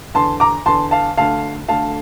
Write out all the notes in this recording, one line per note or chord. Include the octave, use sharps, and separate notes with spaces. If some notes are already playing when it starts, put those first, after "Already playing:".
E2 D3 A5 C6
A#5 D6
E2 D3 A5 C6
F5 A5
D2 D3 F5 A5
D2 D3 F5 A5